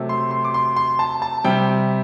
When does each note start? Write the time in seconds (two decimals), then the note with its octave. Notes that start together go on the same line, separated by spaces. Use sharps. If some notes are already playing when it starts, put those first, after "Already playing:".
Already playing: C3 F#3 A3
0.09 C6
0.31 C6
0.45 D6
0.54 C6
0.76 C6
0.99 A5
1.22 A5
1.44 C3 G3 G5